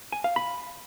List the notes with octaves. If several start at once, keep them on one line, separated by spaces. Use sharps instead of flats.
G#5
F5
B5